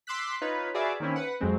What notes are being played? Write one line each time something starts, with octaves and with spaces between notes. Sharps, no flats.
C6 D6 E6 F#6 B6
D#4 F4 B4 C#5
F#4 G#4 B4 D5 E5 F5
D#3 A#3 C4 C#4 E4
B4 F#5
F2 F#3 G#3 C4